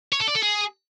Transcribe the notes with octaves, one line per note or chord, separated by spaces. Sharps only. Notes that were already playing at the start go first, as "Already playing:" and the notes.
C#5
A4
D5
A4
G#4